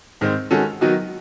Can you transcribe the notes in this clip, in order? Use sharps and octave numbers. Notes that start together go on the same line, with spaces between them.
G#2 D#3 G#3 C4
D#3 G#3 C#4 F#4 A4
D#3 F#3 B3 D#4 F#4